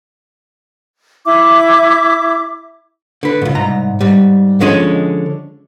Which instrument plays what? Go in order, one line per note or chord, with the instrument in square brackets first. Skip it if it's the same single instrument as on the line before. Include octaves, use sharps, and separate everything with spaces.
[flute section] E4 E5 D6
[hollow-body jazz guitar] D3 B4
C#2 G#2
C2 G#2 A#5
G#2 G3
D3 F3 G#3 C#4 C#5 D#5